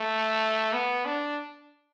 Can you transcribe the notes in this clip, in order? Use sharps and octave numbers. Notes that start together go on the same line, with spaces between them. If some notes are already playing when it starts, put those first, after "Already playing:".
Already playing: A3
B3
D4